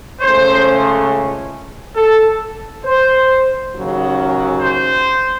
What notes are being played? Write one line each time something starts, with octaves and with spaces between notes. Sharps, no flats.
C#2 C#3 A3 C#4 C5
A4
C5
D#2 C#3 F#3
C5